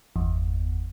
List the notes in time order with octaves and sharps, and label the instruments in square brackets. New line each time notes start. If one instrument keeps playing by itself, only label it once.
[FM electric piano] G1 E2